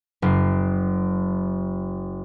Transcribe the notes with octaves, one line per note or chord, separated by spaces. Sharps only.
F#1 C7